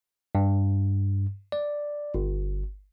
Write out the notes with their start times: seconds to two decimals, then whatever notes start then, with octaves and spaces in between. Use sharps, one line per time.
0.35 G2
1.52 D5
2.14 G1